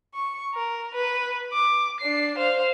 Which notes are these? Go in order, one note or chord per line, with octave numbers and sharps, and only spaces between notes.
C#6
A#4
B4
D6
D4 C7
C5 F5